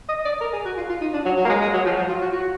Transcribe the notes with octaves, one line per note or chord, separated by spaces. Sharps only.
D#5
D5
A#4
G#4
F#4
F4
F4
D#4
D4
F#3
F#3
A#3
G#3
G#3
F#3
F3
F#3
F4
F#4
F#4